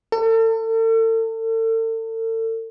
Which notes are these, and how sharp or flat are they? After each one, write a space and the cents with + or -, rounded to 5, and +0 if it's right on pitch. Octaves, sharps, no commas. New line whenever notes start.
A4 +40